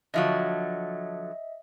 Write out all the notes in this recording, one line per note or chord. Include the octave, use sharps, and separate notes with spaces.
D3 F3 F#3 D#5 E5